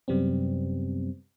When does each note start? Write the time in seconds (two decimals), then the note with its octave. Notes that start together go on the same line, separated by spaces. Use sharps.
0.08 F#2 C3 G3 B3 C4